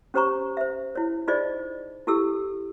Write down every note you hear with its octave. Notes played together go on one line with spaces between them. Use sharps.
C#4 G4 C5 C#5 A#5 C#6
C5 E5
E4 C#5
D#4 F4 G#4 C5 D5 D#5
E4 G4 A4 E6